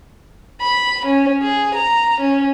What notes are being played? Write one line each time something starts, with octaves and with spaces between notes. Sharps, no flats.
B5
C#4
G#4
A#5
C#4